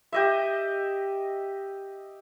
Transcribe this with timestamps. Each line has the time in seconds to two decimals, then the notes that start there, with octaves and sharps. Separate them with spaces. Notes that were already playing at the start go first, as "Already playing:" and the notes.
0.12 G4 D#5 E5